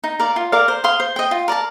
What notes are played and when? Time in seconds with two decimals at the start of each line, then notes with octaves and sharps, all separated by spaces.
0.04 D#4
0.19 A#4 D5 F5
0.36 F4
0.52 A#4 D5 F5
0.68 C5
0.84 F5 C6 D#6
1.00 C5
1.16 D#5 G5
1.31 F4
1.48 A#4 D5 A5